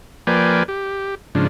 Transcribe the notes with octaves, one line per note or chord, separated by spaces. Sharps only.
F3 A#3 B4 D5 G5 G#5
G4
G#2 C#3 F3 D4